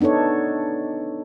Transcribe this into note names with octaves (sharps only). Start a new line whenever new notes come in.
B3 D4 D#4 A4 C#5